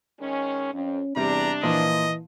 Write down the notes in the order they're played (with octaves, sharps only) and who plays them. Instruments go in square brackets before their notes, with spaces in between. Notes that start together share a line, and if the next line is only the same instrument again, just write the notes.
[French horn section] D#3 G#3 C#4
[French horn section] F2 [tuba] C#4
[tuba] E2 [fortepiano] C3 G3 [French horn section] D4 [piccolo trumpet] A#5
[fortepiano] A#2 F3 [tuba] E3 [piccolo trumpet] D#5